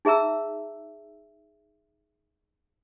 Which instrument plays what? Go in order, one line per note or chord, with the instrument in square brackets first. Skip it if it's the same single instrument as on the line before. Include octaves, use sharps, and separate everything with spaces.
[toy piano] D#4 G#4 E5 A#5 E6